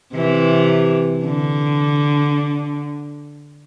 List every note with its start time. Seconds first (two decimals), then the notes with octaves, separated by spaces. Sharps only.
0.14 C3 E3
1.25 D3